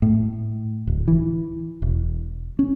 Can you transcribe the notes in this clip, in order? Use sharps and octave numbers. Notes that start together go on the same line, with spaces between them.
A2
D1
E3
E1
C#4